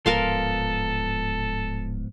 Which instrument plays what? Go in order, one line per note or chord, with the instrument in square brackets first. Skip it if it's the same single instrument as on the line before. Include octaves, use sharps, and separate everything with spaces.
[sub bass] D1 [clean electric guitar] G#2 F3 B3 [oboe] A4 [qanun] A#4 F5 C6